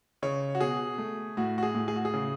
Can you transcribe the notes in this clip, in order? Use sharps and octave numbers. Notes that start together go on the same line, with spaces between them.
C#3 C#5
F#4
B2 G#4
A3
A2 F#4
F#4
G#4
A2
G#4
F#4
G#4
C#3